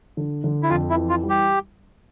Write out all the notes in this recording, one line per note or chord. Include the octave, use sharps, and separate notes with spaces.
D3
D3
E4
F2 F4
E4
E3
F4
G3
G4